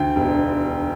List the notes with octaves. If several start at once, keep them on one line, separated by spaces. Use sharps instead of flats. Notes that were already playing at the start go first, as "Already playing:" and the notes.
Already playing: D2 G5
E1